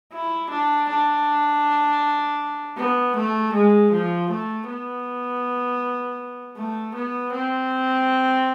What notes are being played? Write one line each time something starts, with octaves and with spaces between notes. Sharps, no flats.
E4
D4
D4
B3
A3
G#3
F3
A3
B3
A3
B3
C4